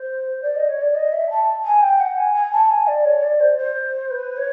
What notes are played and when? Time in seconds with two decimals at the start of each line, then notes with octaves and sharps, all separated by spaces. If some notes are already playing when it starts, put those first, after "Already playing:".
Already playing: C5
0.42 D5
0.55 D#5
0.68 C#5
0.81 D5
0.95 D#5
1.12 E5
1.30 A5
1.64 G#5
1.82 G5
2.00 F#5
2.17 G#5
2.34 G#5
2.52 A5
2.70 G#5
2.87 D5
3.05 C#5
3.23 D5
3.40 C5
3.58 C5
4.10 B4
4.36 C#5